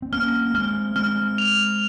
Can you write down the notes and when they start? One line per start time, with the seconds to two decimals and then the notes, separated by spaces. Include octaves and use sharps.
0.02 C4
0.12 A#3 C#4 F6
0.54 G#3 C4 F6
0.96 G#3 C4 F6
1.38 F7